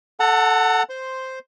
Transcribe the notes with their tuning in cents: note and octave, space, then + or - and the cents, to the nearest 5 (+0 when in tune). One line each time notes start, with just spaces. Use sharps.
A4 +0 F#5 +0 A5 +40
C5 +0 C6 +0